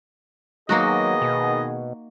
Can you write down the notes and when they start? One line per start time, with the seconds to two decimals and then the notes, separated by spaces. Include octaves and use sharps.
0.69 D#3 F#3 A#3 B3 D#4 F#4 G#4 D#5
1.22 B2